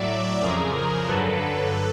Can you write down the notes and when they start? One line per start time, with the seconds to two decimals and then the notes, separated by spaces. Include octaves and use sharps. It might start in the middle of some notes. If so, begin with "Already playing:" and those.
Already playing: A2 F#3 D5 E5
0.42 F2 C#3 F3 G#4 A#4
0.74 G#4 A#4
1.07 G2 D3 F#3 A4 B4